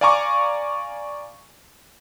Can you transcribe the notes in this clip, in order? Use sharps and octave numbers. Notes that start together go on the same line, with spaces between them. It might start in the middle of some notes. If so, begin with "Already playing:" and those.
D5 F5 G#5 A#5 C#6 D6